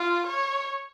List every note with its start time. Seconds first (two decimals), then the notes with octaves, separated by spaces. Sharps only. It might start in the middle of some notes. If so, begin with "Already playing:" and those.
Already playing: F4
0.27 C#5